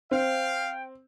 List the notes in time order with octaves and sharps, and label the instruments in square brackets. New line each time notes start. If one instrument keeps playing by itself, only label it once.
[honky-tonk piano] C4 [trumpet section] F5 [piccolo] G5